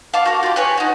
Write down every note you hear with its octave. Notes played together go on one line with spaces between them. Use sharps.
F5 A5 D6
F#4 A#4
F4 G4
B4 C#5 G#5
D#4 F#4